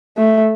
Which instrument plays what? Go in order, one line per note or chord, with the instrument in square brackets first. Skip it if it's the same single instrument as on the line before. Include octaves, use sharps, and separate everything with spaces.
[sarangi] A3